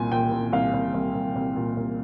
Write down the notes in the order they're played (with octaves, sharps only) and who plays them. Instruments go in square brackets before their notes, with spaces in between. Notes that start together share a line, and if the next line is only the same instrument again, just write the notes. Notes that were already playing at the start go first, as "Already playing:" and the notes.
Already playing: [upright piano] C2 A#2 G#5
A#2 G5
A#2
C2 F5
C2
C2
C2
C2
A#2
C2